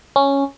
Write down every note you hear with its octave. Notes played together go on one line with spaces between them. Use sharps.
C#4